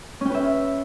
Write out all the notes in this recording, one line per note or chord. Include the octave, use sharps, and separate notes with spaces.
C#4 B4 E5 G5